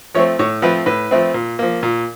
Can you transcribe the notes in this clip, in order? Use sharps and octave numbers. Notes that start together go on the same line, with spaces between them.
F3 A3 C4 C#5
A2 C#5
F3 A3 C4 B4
A2 B4
F3 A3 C4
A#2
F3 A#3
A#2